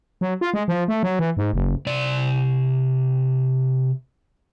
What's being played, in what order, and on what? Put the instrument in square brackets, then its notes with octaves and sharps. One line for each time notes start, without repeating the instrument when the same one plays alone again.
[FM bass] F#3
F4
G#3
F3
A3
F#3
E3
G#2
F#1
[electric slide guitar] C3 D5